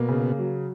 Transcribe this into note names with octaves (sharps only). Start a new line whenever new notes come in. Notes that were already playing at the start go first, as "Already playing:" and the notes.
Already playing: B2 A#3
C#3
F#3